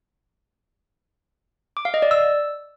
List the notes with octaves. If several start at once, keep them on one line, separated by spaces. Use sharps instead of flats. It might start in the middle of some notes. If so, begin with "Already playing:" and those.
D6
F5
D#5
D5
E6